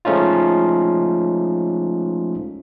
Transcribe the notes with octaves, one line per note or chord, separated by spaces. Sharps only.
F3 G#3 A3 C#4 D#4 F4